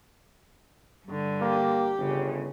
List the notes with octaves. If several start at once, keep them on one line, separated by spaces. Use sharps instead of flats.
G2 D3
A#3 G4
G1 C#3